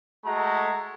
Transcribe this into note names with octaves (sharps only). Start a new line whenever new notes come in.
G#3 A3 F#4 A#5